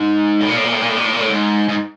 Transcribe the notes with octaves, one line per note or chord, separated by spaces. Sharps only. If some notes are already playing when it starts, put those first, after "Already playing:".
Already playing: G#2
A2
A#2
A2
A#2
A2
A#2
A2
A#2
A2
A#2
A2
G#2
G#2